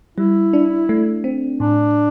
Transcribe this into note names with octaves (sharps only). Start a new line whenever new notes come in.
G3 E4
D4
A3
C4
A2 D4